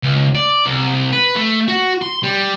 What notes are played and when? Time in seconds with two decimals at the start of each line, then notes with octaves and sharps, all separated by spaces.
0.03 C#2
0.35 D5
0.66 C2
1.13 B4
1.35 A3
1.68 F#4
2.02 C6
2.23 G3